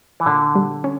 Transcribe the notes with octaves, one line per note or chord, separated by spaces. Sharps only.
E3
A#2 D3
G3
C#4